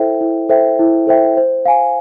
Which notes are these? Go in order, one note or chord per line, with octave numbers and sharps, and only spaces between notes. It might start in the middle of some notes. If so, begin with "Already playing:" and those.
Already playing: E4 A4 C5 E5 G5
E4
A4 C5 E5 G5
E4
A4 C5 E5 G5
C5
F5 G#5